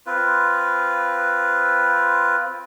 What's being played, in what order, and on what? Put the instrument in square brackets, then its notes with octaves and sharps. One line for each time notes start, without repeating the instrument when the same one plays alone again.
[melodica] C4 F4 B4